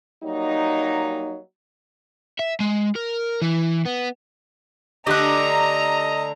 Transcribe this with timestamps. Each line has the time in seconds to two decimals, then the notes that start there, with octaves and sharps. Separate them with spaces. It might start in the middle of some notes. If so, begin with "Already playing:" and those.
0.24 F#3 G3 A#3 D#4
2.39 E5
2.60 G#3
2.96 A#4
3.42 E3
3.86 B3
5.07 D3 A3 G4 D#5 A#5 F#6